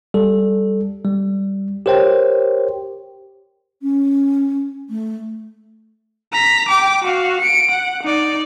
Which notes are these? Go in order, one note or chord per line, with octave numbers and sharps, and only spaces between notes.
G3 A4
G3
G4 A#4 C5 C#5 G5
C#4
A3
A#5 B6
G5 D6
F#4 F5
C#7 D7
F#5
D#4 D5